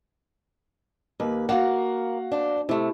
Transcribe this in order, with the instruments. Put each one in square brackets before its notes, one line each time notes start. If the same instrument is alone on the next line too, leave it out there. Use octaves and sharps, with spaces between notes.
[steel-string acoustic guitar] D#2 B4 [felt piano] A#3
[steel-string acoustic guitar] A#3 [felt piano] F#4 F5 F#5
[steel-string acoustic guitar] D4 C5
[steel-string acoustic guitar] C3 A3 [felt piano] E4